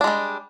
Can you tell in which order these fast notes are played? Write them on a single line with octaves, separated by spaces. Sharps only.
D4 G#3 G3